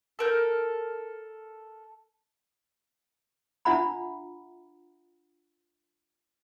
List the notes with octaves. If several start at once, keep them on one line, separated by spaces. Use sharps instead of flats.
A4 A#4 G6
D4 F4 E5 F#5 A#5 B5